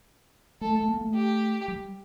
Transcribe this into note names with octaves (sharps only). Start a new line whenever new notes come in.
A3 A4
A3
A#3
A3
G4
G3